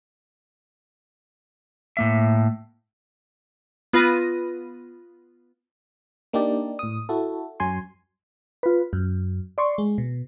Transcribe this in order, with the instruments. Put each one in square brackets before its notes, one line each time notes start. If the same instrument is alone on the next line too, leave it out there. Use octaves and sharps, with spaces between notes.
[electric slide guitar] A2 A#3 E5
[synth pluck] B3 F4 B4 B5 A#6 D#7
[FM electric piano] A#3 D4 D#4 G4 D5
A2 D#6
E4 F#4 A4
F#2 F#3 G#5 C6
F4 B4
F#2
D5 C6 C#6
G#3
B2